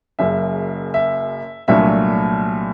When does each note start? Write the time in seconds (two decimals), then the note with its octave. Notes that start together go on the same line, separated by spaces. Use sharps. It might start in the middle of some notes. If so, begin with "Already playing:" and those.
0.19 F#1 F#2 C#3 E5
0.94 E5
1.68 C2 A#2 F#3 A3 D4 E5